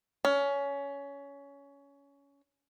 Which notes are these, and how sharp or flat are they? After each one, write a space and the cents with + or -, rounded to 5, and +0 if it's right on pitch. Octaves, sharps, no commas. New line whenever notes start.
C#4 +20